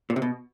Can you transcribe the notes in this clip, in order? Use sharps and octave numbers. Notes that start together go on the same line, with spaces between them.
A#2
C3
B2